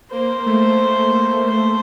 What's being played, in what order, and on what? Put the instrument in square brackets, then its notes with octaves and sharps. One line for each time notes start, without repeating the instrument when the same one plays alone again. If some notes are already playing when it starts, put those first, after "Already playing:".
[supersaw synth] A#3 [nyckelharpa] C5
[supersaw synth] A3
[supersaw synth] A3 [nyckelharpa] C5